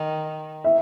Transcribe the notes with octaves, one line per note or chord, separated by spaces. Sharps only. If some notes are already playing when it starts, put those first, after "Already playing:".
Already playing: D#3
E5